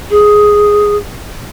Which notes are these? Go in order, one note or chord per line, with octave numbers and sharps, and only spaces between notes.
G#4